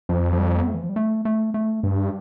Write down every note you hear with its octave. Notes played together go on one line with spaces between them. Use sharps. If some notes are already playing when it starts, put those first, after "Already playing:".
F2 F3
F3
G3
B3
A3
E3
F3
G3
A3
A3
A3
G2